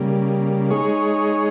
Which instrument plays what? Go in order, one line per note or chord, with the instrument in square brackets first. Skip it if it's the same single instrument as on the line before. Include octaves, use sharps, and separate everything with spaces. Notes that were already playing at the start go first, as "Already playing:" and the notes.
Already playing: [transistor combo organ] C#3 G3 A#3
G#3 D#4 G#4 C#5